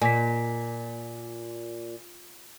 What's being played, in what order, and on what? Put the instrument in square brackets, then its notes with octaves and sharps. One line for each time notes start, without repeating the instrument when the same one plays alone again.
[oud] A#2 [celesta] G#5 B6